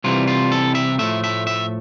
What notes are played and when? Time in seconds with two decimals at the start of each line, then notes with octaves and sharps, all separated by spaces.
0.04 C2 C3 E3 G3 F4
0.27 F4
0.52 A4
0.75 E5
0.99 A2 F3 A3 E5
1.24 E5
1.47 E5